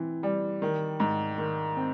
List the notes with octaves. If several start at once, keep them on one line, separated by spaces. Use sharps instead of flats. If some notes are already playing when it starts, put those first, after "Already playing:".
Already playing: E3 C4
G3
D#3
G#2
D#3
C4